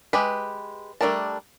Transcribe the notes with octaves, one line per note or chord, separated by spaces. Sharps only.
G#3 G4 B4
G3 A3 D4 A#4 A5